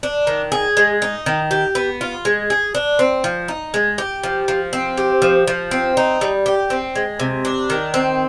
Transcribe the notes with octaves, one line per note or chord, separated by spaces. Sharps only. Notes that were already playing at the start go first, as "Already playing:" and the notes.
D4
D#3
G#4
G#3
D#4
D#3
G4
B3
F4
G#3
G#4
D4
C4
F3
D#4
G#3
G4
F3
F3
C4
G4
F3
F3
C4
D#4
G3
G4
C4
G#3
C3
D4
D#3
C4